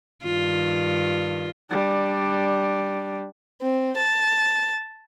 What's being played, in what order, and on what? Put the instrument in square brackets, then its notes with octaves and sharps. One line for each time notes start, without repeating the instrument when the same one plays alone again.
[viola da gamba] G2 D#3 F4
[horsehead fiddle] G3 D4
[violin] C4
A5